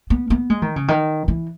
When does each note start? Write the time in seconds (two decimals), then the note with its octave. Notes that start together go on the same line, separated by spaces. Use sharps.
0.10 B3
0.30 B3
0.50 G#3
0.62 D#3
0.76 C#3
0.88 D#3
1.28 E3